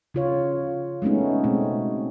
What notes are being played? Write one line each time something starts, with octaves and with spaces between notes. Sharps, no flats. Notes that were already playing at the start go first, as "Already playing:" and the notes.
C#3 F4 C#5
G#3 A3 B3 C#4 D#4
B2 G#3 A3 C4